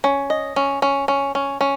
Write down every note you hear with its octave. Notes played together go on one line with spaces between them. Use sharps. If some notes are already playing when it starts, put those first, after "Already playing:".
C#4
D#5
C#4
C#4
C#4
C#4
C#4